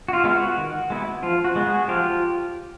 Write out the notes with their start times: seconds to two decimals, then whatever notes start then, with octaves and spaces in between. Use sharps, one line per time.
0.08 F#4
0.13 F4
0.24 G#3 B3 E4 F4
0.35 F#4
0.58 D#3
0.90 G#3 B3 E4
1.23 F3 F4
1.45 F#4
1.56 G#3 B3
1.67 F#4 G#4
1.88 F3 F4 G4